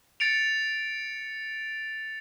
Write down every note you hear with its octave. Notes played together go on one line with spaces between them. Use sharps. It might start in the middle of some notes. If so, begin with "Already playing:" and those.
A6 C#7 D7 F7